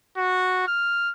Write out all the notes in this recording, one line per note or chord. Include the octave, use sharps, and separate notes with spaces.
F#4
F6